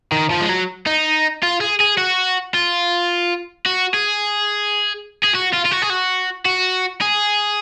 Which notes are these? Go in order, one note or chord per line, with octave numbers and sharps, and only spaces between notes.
D#3
F3
G#3
F#3
D#4
F4
G#4
G#4
F#4
F4
F#4
G#4
G#4
F#4
F4
F4
F#4
G#4
F#4
F#4
G#4